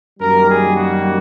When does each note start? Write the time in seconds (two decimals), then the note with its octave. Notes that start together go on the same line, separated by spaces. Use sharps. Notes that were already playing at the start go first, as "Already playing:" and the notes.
0.20 F#2 D#3 G3 A#3 A#4
0.48 G#4
0.75 F#4